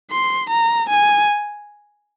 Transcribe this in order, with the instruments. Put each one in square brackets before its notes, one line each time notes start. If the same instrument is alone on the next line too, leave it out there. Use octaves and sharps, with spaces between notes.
[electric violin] C6
A#5
G#5